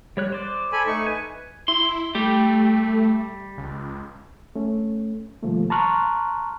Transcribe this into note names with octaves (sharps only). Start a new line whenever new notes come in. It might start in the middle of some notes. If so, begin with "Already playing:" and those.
G3 C#5 F#6
C5 D5
A4 G#5 B5
A3 D#4 C#6
B4 G#5
E4 C6
G3 A3 G4
C#2
A3 C#4
B2 D#3 F3 G3 A3 A#3
A5 A#5 C6 C#6 F6 F#6